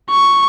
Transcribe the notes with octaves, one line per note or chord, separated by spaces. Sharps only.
C#6